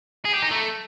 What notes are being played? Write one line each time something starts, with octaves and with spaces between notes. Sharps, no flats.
G#4
G4
D#4
A3